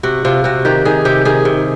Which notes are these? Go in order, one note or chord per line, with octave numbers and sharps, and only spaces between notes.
C3 F#4
C3 F4
C3 F#4
D#3 G4
D#3 G#4
C3 G4
D#3 G#4
C3